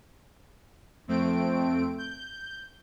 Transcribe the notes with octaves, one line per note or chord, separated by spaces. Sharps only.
F2 A3 C4 D7
G6